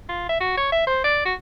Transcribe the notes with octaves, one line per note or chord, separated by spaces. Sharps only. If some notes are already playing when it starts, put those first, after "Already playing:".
F4
E5
F#4
C#5
E5
C5
D5
F#4